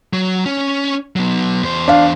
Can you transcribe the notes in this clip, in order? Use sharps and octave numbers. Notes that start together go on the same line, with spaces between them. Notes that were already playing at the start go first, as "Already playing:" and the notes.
F#3
C#4
F#3 B3
E2 C5
D4 F5